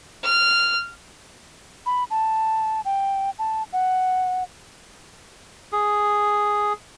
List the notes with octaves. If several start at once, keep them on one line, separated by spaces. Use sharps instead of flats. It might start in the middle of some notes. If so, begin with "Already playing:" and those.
F6
B5
A5
G5
A5
F#5
G#4